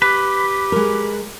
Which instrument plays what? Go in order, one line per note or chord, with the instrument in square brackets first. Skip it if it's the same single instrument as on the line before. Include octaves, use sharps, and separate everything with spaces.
[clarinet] G4 [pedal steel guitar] B4
[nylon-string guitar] G#3 A#4